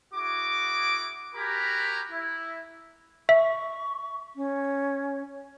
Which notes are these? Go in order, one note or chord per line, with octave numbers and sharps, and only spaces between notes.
E4 F#4 G#4 D6
F#4 G4 A#4 G#5 A#5 B5
E4
E5 C#6
C#4